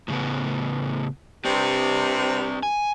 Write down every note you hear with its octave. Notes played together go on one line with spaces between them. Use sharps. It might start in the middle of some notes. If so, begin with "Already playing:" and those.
A2 C#3 B3
G2 C3 C4 D5
G#5